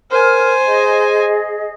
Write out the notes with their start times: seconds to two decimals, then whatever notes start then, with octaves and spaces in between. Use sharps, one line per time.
0.11 A#4 C5 G#5 F6
0.66 G#4 D#5